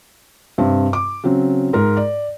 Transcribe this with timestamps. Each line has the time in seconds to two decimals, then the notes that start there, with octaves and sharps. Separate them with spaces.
0.58 G2 C3 C4
0.93 D6
1.24 C#3 F#3 C4
1.73 G#2 A#4
1.97 D5